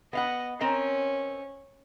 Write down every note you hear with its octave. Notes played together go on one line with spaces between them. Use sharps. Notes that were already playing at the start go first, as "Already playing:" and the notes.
B3 D#5 F5 F#5
C4 C#4 A#4 D#5